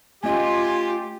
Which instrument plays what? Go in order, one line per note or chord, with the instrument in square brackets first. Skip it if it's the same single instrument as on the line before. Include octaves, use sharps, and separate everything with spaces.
[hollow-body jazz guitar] A3 C#4 D#5 [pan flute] F4 [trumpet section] G4 [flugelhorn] G#5